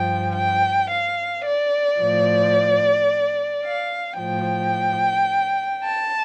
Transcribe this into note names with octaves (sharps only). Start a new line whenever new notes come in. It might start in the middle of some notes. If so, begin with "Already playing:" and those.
Already playing: G2 F3 G5
G5
F5
D5
A2 F3
F5
A2 F3 G5
A5